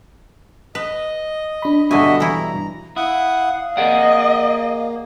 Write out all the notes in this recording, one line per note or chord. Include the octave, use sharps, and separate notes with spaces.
B4 D#5
D4 B5
G2 B2 D3 F#4 D#5 E5 G#5
E3 E4 A#5
E4 F5 F#5 D#6
A#3 G#4 D5 D#5 F#5